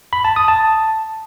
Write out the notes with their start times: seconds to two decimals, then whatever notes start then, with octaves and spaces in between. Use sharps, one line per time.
0.13 B5
0.24 A5
0.36 D#6
0.48 A5